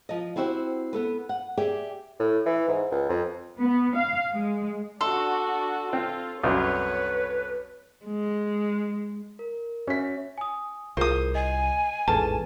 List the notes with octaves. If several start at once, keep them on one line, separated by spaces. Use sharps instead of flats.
F3 D#5
B3 C4 E4 F#4 G4 C5
B3 A4 B4
F#5
G4 G#4 D5 E5 G5
A2
E3
G#2
C#2
F2
B3
F5
G#3
D4 F#4 A4 C6
C4 F4
C2 F#2 B4 C#5
G#3
A#4
C#4 F#4 C#5 E5 B6
G#5 D#6
C2 F4 G#4 A#4 C5 D#6
D#5 G#5
A1 E2 G#2 G#4 A4 B4 A5